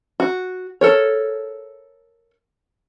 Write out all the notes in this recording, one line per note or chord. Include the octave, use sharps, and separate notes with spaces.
F#4
A4 A#4 C#5